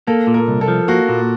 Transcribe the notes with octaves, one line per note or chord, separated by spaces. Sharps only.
A#3 A4
A#2
A#4
C2
A4
F3
A#3 F#4
A#2